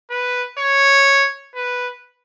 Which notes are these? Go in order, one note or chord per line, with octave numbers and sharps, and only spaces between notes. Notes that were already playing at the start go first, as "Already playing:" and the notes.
B4
C#5
B4